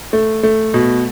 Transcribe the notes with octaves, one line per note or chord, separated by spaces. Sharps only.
A3
A3
B2